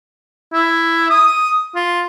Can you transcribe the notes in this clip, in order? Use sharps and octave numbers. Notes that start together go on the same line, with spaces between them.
E4
D#6
F4